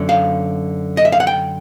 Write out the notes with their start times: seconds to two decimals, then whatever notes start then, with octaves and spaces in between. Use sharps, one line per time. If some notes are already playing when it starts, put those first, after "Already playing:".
Already playing: F#2 D3
0.09 F5
0.97 D#5
1.05 E5
1.12 F5
1.20 F#5
1.27 G5